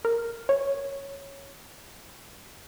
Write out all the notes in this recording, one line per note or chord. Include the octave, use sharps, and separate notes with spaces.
A#4
C#5